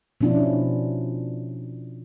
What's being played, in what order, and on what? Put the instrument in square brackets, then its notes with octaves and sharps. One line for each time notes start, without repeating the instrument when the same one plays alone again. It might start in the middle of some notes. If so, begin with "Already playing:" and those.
[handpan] B2 F3 C#4 D4 E4 F4